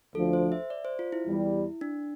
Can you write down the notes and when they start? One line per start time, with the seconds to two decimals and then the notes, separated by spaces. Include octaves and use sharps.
0.15 D2 D3 F3 A4
0.33 C5
0.52 E5
0.70 D5
0.85 C5
0.99 F4
1.12 E4
1.26 E2 E3 G3
1.81 D4